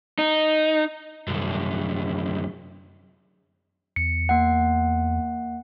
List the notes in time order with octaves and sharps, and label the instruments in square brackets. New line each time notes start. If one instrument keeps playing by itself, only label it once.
[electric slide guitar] D#4
[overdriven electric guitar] C2 F#2
[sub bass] E2 [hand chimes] C#7
[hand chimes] A#3 F#5